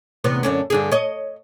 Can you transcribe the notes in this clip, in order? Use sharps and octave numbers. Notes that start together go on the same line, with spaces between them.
E2 C3 B3
F#2 D3 C#4
G2 D3 G#4
C#5 D#5